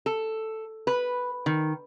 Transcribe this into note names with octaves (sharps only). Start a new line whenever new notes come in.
A4
B4
D#3